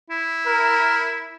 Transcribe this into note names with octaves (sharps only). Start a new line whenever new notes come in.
E4
A#4